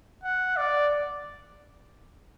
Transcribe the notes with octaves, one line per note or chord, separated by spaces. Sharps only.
F#5
D5